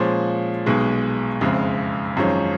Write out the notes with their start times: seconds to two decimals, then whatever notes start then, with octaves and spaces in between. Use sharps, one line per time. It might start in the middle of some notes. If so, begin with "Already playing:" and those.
Already playing: A#2 F3 G#3 C#4
0.66 B1 B2 G#3
1.41 F#1 F2 C#3 G#3
2.17 G#1 F#2 F3 G#3 C#4